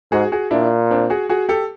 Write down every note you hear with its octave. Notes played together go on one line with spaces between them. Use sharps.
G#2 F#4 G#4
F#4 G#4
A#2 D4 E4
C4 D4
F#4 G#4
F#4 G#4
G4 A4